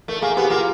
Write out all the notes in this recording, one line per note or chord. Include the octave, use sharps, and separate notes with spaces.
A3 A#4
A#3 G#4
B3 G4
A#3 F4